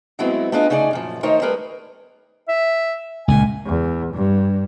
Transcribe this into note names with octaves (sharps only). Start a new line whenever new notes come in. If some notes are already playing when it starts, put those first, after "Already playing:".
F#3 G#3 A3 B3 C4 E4
A3 B3 D4 F4 G#4 D#5
C#3 A3 D#4 G#4 D5
F#2 A#2 F3
D#3 A3 D#4 A#4 C5 C#5
G3 A3 G#4 A#4 B4
E5
C#2 A#2 G#5
E2
G2